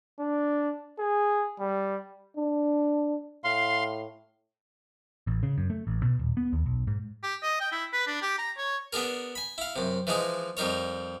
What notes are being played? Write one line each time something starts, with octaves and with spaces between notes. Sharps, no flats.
D4
G#4
G3
D4
A2 F5 C6
A1
C#3
F#2
A3
A1
B2
D#1
B3
D#2
B1
G#2
G4
D#5
G5
E4
B4
D4
G4
A#5
C#5
B3 D4 G#4 A#4
G#5 B5
E4 F5
F#2 C3
E3 F3 G#3 D#4 G#4
F2 G3 D#4 A#4 C#5